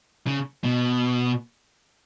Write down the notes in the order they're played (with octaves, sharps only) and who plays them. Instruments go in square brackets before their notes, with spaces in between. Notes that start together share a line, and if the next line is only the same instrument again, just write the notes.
[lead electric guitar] C#3
B2